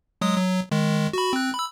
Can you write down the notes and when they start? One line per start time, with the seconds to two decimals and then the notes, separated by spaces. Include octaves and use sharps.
0.21 F#3 G#3 D#6
0.37 F#3
0.71 D#3 G#3
1.13 F#4 B5
1.33 C4 F#6
1.55 B5 E6